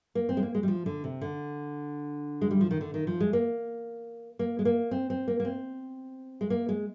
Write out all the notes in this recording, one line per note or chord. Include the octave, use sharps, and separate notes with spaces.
A#3
C4
G#3
A#3
G#3
G3
F3
D3
C3
D3
G#3
G3
F3
D#3
D3
D#3
F3
G#3
A#3
A#3
G#3
A#3
C4
C4
A#3
A#3
C4
G#3
A#3
G#3